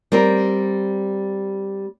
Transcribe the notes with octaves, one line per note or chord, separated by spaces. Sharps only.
G3 C4 A#4